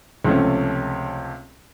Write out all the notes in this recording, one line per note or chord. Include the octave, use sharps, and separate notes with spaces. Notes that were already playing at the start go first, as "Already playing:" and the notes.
C#2 C3 F3 A3 C#4